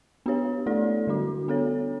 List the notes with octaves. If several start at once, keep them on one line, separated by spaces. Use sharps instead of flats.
B3 D4 G4 C#5
A3 E4 A4 D5
D3 G3 D4 F#4
B3 D4 A4 C#5